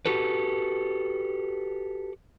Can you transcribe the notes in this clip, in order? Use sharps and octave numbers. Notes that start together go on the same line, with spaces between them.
F#4 G4 A4 B4